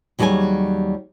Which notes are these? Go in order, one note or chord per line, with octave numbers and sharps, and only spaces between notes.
D#2 F#3 G3 G#4 C#5 G#5